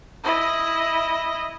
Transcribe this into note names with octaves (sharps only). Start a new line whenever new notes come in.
E4 D#5